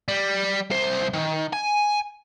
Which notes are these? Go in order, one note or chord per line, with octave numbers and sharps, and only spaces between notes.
G3
C2 C5
D#3
G#5